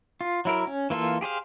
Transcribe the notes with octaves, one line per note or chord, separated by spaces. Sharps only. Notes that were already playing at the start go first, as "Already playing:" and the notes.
F4
F#3 E4 A#4
C#4
E3 A#3 F4 A4
G4 G#4 C5 F5